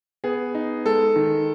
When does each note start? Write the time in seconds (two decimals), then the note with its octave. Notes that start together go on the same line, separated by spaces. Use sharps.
0.24 B3 G#4
0.55 D#4
0.85 G#3 A4
1.16 D#3